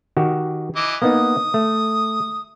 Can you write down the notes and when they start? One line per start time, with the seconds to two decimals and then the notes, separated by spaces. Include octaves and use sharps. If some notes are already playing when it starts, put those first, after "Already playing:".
0.17 D#3 F#4 G4
0.76 E3 D#5 D6
1.02 A#3 B3 D#4 D#6
1.54 A3